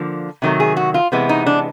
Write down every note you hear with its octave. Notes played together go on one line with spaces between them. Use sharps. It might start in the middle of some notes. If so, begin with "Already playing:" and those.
Already playing: D3 F3 A#3
C3 D#3 F#3 A3
G#4
F#4
F4
C3 E3 G#3 B3
D#4
D4